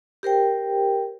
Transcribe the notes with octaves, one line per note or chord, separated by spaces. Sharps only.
G4 A#4 C5 G5